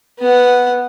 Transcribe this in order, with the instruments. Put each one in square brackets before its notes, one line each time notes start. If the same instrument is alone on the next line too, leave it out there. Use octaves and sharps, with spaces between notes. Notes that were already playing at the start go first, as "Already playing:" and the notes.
[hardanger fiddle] B3 F#5